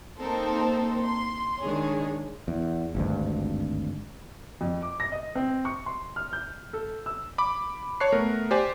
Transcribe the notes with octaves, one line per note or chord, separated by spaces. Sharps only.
A#3 C4 D#4 A4 A#4 C5
C6
D#3 G#3 D4 G#4 C#5
E2
G#1 D2 G2
F2
D6
A#6
D#5
C4
C#6
C6
F6
G6
A4
E6
B5 D6
C#5 A5 C#6 F#6 C7
A3 B3 A#4
G4 C5 D5 G#5